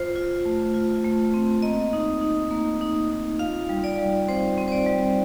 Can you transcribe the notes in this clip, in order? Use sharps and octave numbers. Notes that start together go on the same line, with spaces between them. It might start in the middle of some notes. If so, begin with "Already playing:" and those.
Already playing: F4 C5
F4
A3
F4
A3
C4
A#3 D#5
D#4
D#4
A#3
D#4
D#4
F4 F5
G3
D5
G3
C4 C5
C4
C5
D5
G3